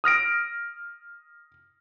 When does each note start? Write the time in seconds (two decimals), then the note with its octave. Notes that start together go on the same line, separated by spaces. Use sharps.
0.04 D#6 F6 A#6 D7